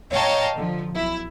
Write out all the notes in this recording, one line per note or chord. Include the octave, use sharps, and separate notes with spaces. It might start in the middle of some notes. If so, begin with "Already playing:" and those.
C#5 D#5 F5 G5 A5 A#5
D3 F3
B1 E4